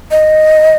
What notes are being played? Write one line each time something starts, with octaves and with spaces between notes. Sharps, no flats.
D#5